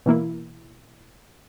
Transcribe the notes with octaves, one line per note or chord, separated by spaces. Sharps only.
B2 E3 A#3 E4